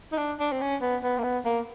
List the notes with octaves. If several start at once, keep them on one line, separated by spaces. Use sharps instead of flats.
D#4
D4
D4
C4
C#4
B3
B3
A#3
B3
A#3